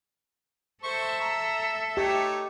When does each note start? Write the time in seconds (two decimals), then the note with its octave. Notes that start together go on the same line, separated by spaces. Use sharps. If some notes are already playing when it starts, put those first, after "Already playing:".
0.84 A4 C5 E5 C#6
1.21 A#5
1.97 A3 D#4 G4 C#5